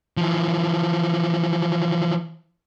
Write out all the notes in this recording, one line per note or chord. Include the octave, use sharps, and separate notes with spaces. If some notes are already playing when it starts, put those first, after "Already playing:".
E3 F3